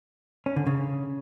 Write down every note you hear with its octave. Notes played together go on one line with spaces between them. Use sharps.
C#4
D3
C#3